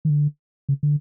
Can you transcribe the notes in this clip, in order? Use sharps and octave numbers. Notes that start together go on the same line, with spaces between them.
D#3
D3
C#3
D3